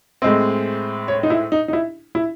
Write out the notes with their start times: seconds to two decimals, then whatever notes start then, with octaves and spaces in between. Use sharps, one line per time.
0.22 A2 G#3 C4 D#5
1.08 C#5
1.23 D#4
1.30 E4
1.52 D#4
1.68 D#4
1.73 E4
2.15 E4